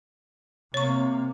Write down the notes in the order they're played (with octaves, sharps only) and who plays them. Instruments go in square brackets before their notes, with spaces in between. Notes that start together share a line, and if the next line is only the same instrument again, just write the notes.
[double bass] C3 A#3 [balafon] C#5 C#6